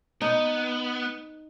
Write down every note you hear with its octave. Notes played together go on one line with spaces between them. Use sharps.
B3 D#4